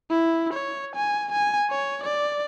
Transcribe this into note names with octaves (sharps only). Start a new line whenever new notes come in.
E4
C#5
G#5
G#5
C#5
D5